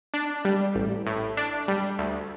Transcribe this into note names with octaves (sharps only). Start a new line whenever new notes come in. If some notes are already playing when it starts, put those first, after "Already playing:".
D4
G3
A1
A2
D4
G3
D2